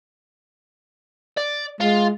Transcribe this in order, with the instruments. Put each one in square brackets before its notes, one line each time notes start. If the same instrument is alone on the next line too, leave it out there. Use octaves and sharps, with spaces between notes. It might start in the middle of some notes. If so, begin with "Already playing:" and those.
[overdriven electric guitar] D5
[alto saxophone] G#3 [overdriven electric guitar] F4